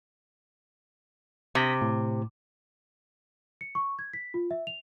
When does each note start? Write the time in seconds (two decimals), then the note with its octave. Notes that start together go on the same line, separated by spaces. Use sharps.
1.55 C3 D#6 A#6 B6
1.82 A2
3.61 C#7
3.75 C#6
3.99 G#6
4.13 B6
4.34 F4
4.51 E5
4.67 F7